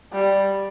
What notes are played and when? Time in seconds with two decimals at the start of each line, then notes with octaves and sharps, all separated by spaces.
0.12 G3